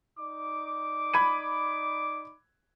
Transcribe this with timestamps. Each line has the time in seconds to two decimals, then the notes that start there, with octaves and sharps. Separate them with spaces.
0.18 D#4 D5 D6
1.14 B5 G#6 D#7